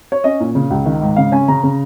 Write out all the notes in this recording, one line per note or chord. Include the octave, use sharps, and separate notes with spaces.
C#5
C#4 D#5
A#2
C#3
C#2
D#3
G#2
C#3 F5
C#4 G#5
C#3 A#5
C#3